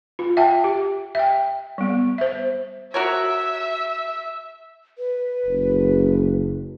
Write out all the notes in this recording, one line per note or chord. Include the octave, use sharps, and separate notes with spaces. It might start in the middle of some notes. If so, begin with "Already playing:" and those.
F4
E5 F#5 G5 A5
G4
E5 G5
G3 B3
C5 E5
F#4 A#4 C#5 E5
B4
F#1